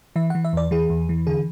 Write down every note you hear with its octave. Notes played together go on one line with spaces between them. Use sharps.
E3 E5
E3 F#5
E5
E2 D5
E3 G#4
E2
E3
D3 G#4